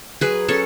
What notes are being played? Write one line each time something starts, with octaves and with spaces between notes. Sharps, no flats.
F#3 G#4 B4
C#4 A4 C#5